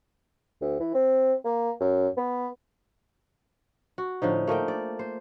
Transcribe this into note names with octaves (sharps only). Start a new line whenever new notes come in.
D2
E3
C4
A#3
F#2
B3
F#4
A2 D3 F3 D#4
A3 A#3 D#5 G5
D5
C5